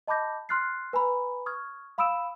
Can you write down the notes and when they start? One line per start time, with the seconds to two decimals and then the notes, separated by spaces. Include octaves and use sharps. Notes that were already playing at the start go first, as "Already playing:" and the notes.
0.07 D#5 A5 B5 D6 G6 A#6
0.49 C6 F6 F#6 A6 C7
0.93 B4 G#5 A#5 B5
1.46 C#6 D#6 F6 G#6
1.98 F5 B5 D#6 E6 D7 E7